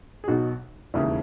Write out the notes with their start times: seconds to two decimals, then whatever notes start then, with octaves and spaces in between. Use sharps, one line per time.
0.24 G#4
0.28 B1 B2 D#4 F#4
0.94 E1 D#2 C#3 E3 C#4 E4